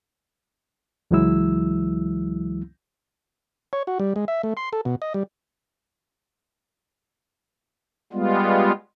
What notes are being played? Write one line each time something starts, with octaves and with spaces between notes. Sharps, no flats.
C#2 E3 F#3 G#3 E4 E6
C#5
F#4
G3
G#3
E5
A3
C6
A4
B2
D#5
G3
G3 G#3 B3 F4